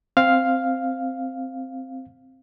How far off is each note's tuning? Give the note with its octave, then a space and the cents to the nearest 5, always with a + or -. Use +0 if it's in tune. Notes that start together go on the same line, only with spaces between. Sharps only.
C4 +0 F5 +0